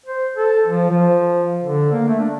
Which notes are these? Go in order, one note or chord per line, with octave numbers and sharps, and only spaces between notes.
C5
A4
F3
F3
D3
A#3
A3
D4